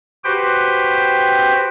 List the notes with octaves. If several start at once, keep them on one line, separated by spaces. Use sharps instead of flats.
F#4 G4 B4 C5 G5